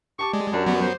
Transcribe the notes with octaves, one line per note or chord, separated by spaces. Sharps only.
G4 A5 C#6 D6
G#3 D5
F#2 D4 G4 A#4
F#3 B3 D5
C5